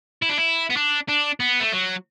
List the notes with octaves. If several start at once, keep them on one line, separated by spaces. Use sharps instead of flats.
E4
D4
E4
B3
D4
D4
B3
A3
F#3